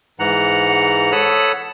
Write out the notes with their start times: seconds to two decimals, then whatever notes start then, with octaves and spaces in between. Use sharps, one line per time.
0.19 G#2 E3 F#5 A#5
1.12 A4 C#5 F#5 B5 D#6 E6